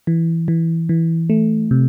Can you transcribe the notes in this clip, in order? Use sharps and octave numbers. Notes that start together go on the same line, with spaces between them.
E3
E3
E3
A3
C3